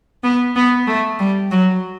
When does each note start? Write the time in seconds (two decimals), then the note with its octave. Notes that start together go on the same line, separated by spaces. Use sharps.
0.23 B3
0.56 B3
0.87 A3
1.19 G3
1.51 F#3